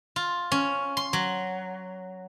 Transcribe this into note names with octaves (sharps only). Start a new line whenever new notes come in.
F4
C#4
C6
F#3